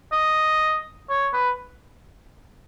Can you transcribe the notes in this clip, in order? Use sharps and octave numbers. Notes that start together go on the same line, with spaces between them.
D#5
C#5
B4